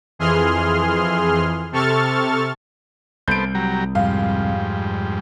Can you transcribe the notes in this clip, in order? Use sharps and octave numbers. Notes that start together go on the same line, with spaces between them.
F2 E3 G#4 C6 F6
C3 A4 C#6 F6 A6
C2 B3 A4 C5 G6 D7
F#3 G4 A#5
F2 G#2 G3 F5